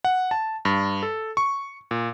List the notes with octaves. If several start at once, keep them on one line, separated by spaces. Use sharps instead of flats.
F#5
A5
G2
A4
C#6
A#2